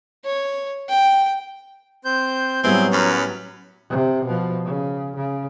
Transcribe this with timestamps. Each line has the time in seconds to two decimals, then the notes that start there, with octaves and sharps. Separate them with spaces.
0.25 C#5
0.89 G5
2.05 C4 C5 G6
2.64 A2 F#3 G3 B3 C4 E4 G#4
2.92 F#2 C#4 B5 F6
3.90 C3
4.25 B2 F3
4.65 C#3
5.16 C#3